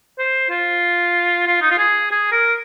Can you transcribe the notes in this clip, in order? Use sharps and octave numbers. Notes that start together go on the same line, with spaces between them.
C5
F4
F4
D#4
F4
G#4
G#4
A#4